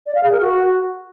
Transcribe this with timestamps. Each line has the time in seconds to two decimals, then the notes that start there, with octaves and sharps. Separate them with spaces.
0.06 D5
0.15 F5
0.23 G#4
0.32 A#4
0.40 F#4